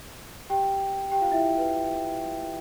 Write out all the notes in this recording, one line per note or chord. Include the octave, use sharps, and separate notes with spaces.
G4 G5
G4 G5
F4 F5
E4 E5
B4